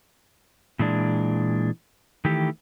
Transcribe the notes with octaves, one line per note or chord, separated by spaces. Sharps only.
A#2 E3 G#3 D4
D#3 E3 A3 G4